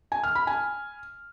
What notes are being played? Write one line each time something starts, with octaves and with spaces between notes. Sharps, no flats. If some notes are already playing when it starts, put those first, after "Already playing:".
G#5
F6
B5
G#5